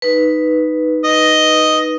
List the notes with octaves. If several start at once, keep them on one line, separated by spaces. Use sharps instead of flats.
D#4 B4
D#5